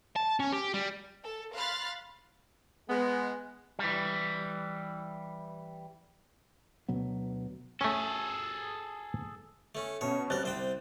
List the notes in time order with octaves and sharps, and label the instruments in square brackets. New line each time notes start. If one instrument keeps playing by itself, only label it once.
[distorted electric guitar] A5
C#4
G4
G3
[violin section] A4
F5 B5 C6 F6 F#6 A6
[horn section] G#3 B3
[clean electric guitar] E3 G3
[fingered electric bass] D2 B2 F#3 B3
[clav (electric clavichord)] A3 C#4 [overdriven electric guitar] G#4 A4
[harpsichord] A3 C#4
[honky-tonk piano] B2 C#4 [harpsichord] C#5
[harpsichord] G3 A#4 [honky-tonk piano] C4 F#6 A6
[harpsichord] C2 C5 G5